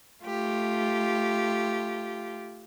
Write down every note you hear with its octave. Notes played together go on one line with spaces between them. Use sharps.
A3 F4 G4